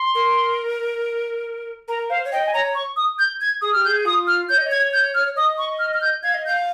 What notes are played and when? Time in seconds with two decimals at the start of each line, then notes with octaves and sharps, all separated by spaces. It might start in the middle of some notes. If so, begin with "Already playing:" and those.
Already playing: C6
0.15 A#4
1.88 A#4 A#5
2.10 C5 F5
2.25 C#5
2.32 D#5 G5
2.46 G#5
2.53 C#5 A#5
2.75 C#6
2.96 D#6
3.19 G6
3.41 G#6
3.62 G#4 D#6
3.73 G4 F6
3.85 G#4 G6
4.05 F4 D#6
4.27 F6
4.49 C#5 G6
4.58 D#5
4.66 C#5
4.71 G#6
4.93 G6
5.15 F6
5.36 D#5 D#6
5.58 C#6
5.79 F6
5.94 F6
6.02 G6
6.23 F5 G#6
6.34 D#5
6.46 F5 G6